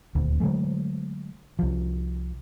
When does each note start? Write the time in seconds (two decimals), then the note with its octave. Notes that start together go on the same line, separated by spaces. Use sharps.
0.15 D#1 D2
0.40 D3 F#3 G#3 A3
1.59 C2 F3